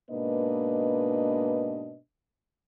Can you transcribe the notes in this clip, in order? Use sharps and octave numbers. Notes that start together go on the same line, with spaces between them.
G#2 B2 A#3 D4 B4 D#5